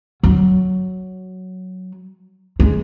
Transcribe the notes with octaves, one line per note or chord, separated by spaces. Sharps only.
F#3
G#3